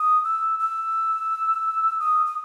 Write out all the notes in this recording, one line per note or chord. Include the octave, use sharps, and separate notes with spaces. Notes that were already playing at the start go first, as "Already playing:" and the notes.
Already playing: D#6
E6
E6
D#6
D#6